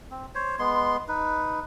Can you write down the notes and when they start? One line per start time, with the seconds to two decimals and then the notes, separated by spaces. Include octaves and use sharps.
0.11 C4
0.35 C5 C#5
0.59 G#3 B3 C6
1.08 D#4 B4